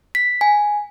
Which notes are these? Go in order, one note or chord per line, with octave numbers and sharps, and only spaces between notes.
B6
G#5